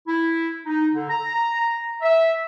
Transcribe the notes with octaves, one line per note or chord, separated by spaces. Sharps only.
E4
D#4
D3
A#5
E5